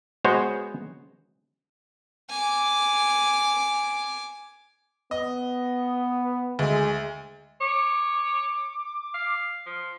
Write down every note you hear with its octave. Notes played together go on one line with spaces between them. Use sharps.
G#3 B3 F#4 C5 C#5 D#5
G#5 D6
B3 D#5
D2 G#3
C#5 D6
F5
F3